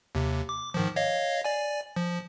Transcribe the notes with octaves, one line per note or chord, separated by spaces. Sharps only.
D#2 C3
D6
G#2 D#3 F3
C#5 D#5 F5
D5 G#5
F3